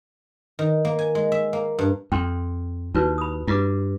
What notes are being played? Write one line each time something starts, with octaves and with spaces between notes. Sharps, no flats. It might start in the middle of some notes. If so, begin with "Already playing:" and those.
D#3
A#3
G#5
G#3
E5
A#3
G2
F2 G5 C6
D#2 E4 F#4 B4
B5 D#6
G2 F4 B4 D6